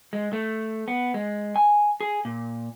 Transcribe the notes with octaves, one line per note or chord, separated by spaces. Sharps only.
G#3
A3
B3
G#3
G#5
G#4
A#2